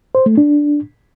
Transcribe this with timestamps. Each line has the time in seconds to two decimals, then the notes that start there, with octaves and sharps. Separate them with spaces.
0.15 C5
0.26 A3
0.37 D4